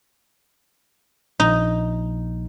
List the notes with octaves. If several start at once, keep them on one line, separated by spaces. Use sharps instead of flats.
A#1 D#4